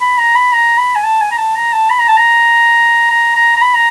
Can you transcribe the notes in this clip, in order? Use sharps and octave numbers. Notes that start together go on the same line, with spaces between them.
B5
A#5
B5
A#5
B5
G#5
A5
G#5
A#5
A5
A#5
A5
B5
A#5
A5
A#5
A#5
A#5
A#5
B5
A#5